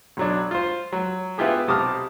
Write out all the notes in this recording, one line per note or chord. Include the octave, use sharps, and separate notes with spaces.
B1 F#3 D4
F4 C5
F#3
B3 E4 F4 G4 G#4
B1 C3 A5 D6 D#6 F6